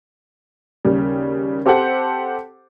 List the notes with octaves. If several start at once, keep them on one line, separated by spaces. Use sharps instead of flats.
D#2 C#3 G3
C4 G4 A4 C5 F#5